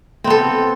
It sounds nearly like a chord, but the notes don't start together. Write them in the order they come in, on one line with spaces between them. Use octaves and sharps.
C4 B3 A4